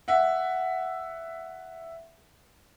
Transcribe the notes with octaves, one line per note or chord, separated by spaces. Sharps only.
E5 F#5